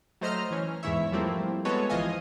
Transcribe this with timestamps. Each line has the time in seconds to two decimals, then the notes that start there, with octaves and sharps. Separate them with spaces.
0.21 F#3 A3 C5 D#5 A#5 F6
0.51 E3 C#4
0.83 E2 G#2 E3 E4 C#5 E5
1.12 F3 G3 A3 A#3 C4 E4
1.65 G#3 B3 F#4 A4 B4 C#5
1.89 G#1 E3 F3 D#5 F5 G#5